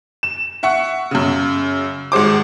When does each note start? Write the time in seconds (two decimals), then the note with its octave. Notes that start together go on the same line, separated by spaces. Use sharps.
0.23 E7
0.63 E5 F#5 C#6 C#7
1.11 F#2 C#3
2.12 G#1 G#3 C5 D6